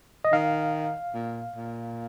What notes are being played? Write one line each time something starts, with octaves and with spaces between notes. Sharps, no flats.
D#5
D#3 F5
A#2
A#2